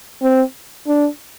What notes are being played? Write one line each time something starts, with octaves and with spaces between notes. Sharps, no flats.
C4
D4